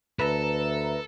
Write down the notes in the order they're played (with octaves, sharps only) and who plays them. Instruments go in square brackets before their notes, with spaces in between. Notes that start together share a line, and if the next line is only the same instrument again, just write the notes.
[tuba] D2 [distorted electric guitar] A4 [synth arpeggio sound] B4 E5 A#5